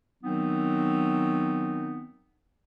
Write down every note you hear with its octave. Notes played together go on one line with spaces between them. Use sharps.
D#3 F#3 B3 C4 D#4